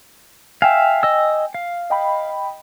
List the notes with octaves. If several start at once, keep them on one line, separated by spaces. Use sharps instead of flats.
E5 F5 G5 G#5
D#5 E6
F5
D#5 G5 B5